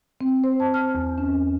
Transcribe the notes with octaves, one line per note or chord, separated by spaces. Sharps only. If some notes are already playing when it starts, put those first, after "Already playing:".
C4
C5
A5
F6
E2
C#4